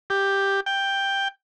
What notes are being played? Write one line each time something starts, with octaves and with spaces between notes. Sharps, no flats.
G4
G5